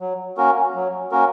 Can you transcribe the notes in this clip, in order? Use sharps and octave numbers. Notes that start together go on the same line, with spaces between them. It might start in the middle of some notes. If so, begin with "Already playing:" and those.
F#3
A#3 C#4 F#4 A#4
F#3
A#3 C#4 F#4 A#4